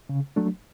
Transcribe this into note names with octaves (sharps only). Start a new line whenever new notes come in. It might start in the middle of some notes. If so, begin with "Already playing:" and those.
C#3
F#3 A3 D4